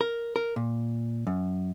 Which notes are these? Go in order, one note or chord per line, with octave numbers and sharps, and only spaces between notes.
A#4
A#4
A#2
F#2